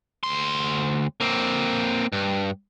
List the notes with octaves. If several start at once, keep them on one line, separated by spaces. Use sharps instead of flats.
D2 C6
A#3 C4
G2